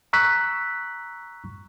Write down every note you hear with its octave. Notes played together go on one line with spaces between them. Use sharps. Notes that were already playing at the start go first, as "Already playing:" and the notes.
A#5 C#6 E6 F#6 B6